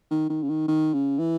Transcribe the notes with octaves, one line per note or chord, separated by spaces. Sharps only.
D#3
D#3
C#3
D#3
D#3
C#3
E3